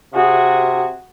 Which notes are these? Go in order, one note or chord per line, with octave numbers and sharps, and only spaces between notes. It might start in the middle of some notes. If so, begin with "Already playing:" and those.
C3 F#4 G#4